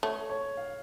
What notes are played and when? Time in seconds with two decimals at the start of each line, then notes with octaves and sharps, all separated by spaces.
0.03 A3 C#5
0.30 C#5
0.57 F5